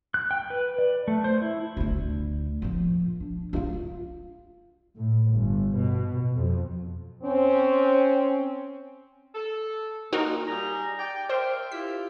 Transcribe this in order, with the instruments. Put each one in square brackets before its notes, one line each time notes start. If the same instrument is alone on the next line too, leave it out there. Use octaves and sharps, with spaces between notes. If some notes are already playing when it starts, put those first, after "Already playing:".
[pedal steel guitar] F#6
G5
B4
D5
A3
C5
E4
[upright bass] D2 D3
A#2 F3
D4
G2 F4
[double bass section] A2
G1
B2
F2
[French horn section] C4 C#4
[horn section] A4
[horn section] A#2 [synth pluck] D#4 F#4 A#4
[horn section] G3 G#4 A#5
D5 G5
[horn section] A#4 E5 G5 [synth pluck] C5
[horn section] E4 F4 G4 [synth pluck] B6